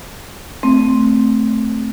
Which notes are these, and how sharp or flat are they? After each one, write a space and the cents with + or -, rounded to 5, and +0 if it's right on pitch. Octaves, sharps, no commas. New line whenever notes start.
A3 +0 C4 +0